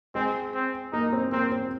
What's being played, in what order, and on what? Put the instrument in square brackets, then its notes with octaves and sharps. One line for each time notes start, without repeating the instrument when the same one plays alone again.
[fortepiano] G#3 [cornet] C4
[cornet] C4
[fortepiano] A#3 [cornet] D#4
[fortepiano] C4
[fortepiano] A#3 [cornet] C4
[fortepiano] C4